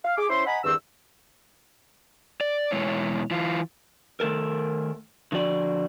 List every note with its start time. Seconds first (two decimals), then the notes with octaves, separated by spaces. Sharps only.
0.05 F5
0.18 G#4 D6
0.30 C#4 E4 C5 E5 C6
0.46 D#5 F#5 G#5 A#5 B5
0.64 E2 G2 D#3 C4 E6
2.41 D5
2.72 E2 B2 G#3 E4 C#5
3.31 E3 F4
4.20 D#3 A3 A4 A#4
5.32 D3 F3 F#4 D5